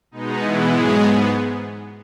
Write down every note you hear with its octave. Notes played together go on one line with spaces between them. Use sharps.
B2 G#3 B3 D#4
E3 E4
G#2 F#3 G#3 B3 G#4